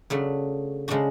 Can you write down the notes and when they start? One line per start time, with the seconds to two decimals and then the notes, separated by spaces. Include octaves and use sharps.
0.10 C#3 F#3 A3 D4
0.88 C#3 G#3 D4 F#4